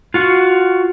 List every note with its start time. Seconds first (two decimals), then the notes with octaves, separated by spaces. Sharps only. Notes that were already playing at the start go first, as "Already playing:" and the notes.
0.14 F4 F#4